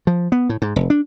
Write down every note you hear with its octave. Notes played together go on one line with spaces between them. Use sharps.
F3
B3
A2
G#2
F1
D4